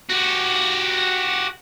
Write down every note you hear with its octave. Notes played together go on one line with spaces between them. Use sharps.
F#4 G4